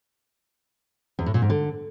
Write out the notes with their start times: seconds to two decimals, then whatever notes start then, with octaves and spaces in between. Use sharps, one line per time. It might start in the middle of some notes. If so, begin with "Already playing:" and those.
1.19 E2
1.26 A2
1.34 A#2
1.42 G#2
1.50 D3